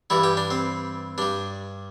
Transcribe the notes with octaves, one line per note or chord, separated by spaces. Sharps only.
G2 E3 G3 E4
G4
D4
C4
G2 G3 D4